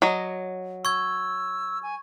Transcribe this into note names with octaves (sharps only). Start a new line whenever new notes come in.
F#3 D#5
C#6 E6 G#6
G#5